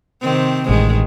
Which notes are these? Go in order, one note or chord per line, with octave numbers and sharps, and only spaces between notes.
C3 D#3 C4
A1 D#3 G#3